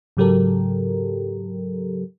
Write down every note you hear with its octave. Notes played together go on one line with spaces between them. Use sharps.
G#2 C#3 F#3 G4 A4 A#4